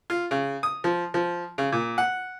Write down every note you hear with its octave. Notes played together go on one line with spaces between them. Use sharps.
F4
C#3
D#6
F3
F3
C#3
A#2
F#5